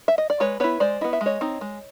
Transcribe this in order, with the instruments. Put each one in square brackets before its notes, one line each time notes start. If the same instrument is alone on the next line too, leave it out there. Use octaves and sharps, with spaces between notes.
[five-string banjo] E5
D#5
D5
G#3 B4 C#5
B3 E4 B4 C#5
G#3 C5 D5
B3 E4 D#5
E5
G#3
C#5 D#5
C4 D#4
G#3